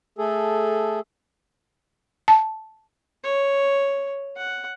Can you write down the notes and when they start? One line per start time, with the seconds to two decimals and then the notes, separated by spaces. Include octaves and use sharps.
0.18 A3 G#4 A4
2.28 A5
3.24 C#5
4.37 F#5